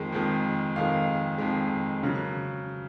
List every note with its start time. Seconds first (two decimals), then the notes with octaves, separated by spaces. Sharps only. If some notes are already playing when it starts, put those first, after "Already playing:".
Already playing: F2 D#3 G#3
0.12 F2 D#3 G#3
0.75 F2 D#3 G#3 F5
1.38 F2 D#3 G#3
2.03 C#3 F#3